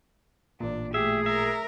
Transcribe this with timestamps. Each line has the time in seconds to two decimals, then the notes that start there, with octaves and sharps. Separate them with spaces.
0.60 A1 A#2 D4
0.94 A3 G4 G#4 E5
1.26 A#4 E5